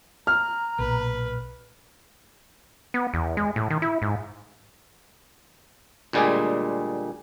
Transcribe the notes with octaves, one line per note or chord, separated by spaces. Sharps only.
A#5 F6
B1 A#2 B4
B3
E2
G#3
A2
D#3
E4
G#2
D2 A#2 G3 G#3 G4 G#4